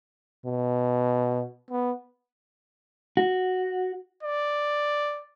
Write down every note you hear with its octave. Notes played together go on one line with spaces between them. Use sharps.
B2
B3
F#4
D5